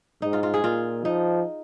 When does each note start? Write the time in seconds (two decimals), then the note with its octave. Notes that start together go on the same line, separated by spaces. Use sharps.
0.22 G#2 D#4
0.33 F4
0.43 F4
0.54 G#4
0.63 A#2 F4
1.05 F3 D#4